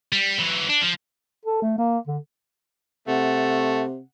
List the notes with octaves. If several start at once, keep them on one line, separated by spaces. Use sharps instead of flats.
G3
E3 F#3
D4
F3
A4
A3
A#3
D3
C3 A3 F#5